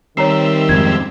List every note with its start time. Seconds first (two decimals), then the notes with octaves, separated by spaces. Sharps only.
0.17 D#3 G3 C4 C#5 E5 A#5 C7
0.69 F2 G#2 G#6